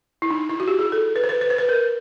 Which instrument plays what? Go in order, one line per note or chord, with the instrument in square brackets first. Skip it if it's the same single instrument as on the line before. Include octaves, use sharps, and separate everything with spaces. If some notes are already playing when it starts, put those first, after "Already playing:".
[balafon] E4
D#4
E4
F#4
G4
G#4
A4
B4
C5
B4
B4
C5
B4
A#4